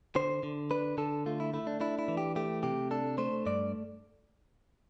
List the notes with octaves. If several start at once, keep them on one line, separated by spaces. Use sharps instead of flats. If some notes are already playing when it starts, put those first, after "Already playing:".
D3 C5
D3
D4 B4
D3 A4
A3 F4
E4
A3 E4
D4
D4 E4
E4
E3
G4
A3 G4
C3 G4
D4 A4
A3 C5
G2 D5